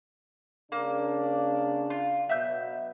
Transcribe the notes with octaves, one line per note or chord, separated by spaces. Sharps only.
C#3 A#3 D4
F4
B2 F#3 E5 G6